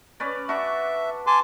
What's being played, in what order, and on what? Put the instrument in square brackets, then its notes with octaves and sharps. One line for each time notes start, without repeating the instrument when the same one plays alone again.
[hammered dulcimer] C#4 B4 D5
[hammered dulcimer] D4 F#4 [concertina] E5
[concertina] G#5 A5 D6 [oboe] C6